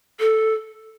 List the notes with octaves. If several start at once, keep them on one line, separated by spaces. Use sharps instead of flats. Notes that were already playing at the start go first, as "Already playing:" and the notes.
A4